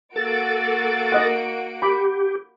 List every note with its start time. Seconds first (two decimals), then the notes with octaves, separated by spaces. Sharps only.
0.16 A#3 F#4 A4 A6 D7
1.12 D#5 F#5
1.82 G4 B5 D6